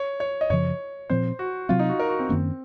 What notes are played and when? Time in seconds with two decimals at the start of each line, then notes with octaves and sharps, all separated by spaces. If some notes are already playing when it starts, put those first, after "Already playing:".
Already playing: C#5
0.20 C#5
0.41 D#5
0.50 F#2 C#3 F3 C#5
1.10 A#2 F3 C4 C5
1.39 F#4
1.69 C3 F#3 C4 F4
1.79 D#4
1.89 F#4
1.99 A#4
2.09 F#4
2.19 C4
2.29 F#2 D#3 A#3 C#4